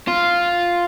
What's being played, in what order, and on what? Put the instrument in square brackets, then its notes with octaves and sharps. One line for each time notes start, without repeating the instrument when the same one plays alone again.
[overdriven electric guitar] F4